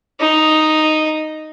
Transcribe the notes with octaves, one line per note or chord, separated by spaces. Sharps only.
D#4